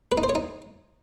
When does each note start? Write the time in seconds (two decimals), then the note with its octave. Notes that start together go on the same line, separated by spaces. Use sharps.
0.12 B4
0.18 D#4
0.23 C5
0.29 C#5
0.35 D#4